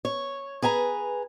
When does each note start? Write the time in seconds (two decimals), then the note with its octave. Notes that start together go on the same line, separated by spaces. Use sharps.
0.05 C#5
0.62 G#4 B4 G#5 A#5